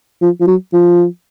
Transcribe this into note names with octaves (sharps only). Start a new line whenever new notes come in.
F3
F3
F#3
F3